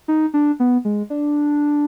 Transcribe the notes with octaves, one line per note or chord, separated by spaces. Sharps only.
D#4
D4
B3
G#3
D4